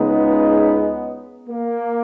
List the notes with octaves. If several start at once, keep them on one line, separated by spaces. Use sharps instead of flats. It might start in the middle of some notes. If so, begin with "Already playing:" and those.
Already playing: C#2 C#3 G#3 B3 D#4
A#3